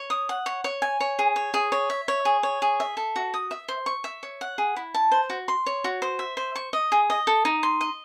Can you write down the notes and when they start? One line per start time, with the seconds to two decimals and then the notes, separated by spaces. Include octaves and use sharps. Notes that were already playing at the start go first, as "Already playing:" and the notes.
Already playing: C#5
0.10 D#6
0.29 F#5
0.46 C#5
0.64 C#5
0.82 G#5
1.00 C#5
1.19 G#4
1.36 C#5
1.54 G#4
1.72 C#5
1.90 E5
2.08 C#5
2.25 G#4
2.43 C#5
2.62 G#4
2.80 E5
2.97 A4
3.16 F#4
3.34 D#6
3.51 E5
3.68 C5
3.86 C#6
4.04 E5
4.23 C#5
4.41 F#5
4.58 G#4
4.76 E4
4.94 A5
5.11 C5
5.30 F#4
5.48 C6
5.66 C#5
5.84 F#4
6.02 C5
6.19 E5
6.37 C5
6.56 C#6
6.73 D#5
6.92 G#4
7.10 D#5
7.27 A4
7.45 D#4
7.63 C6
7.81 D#5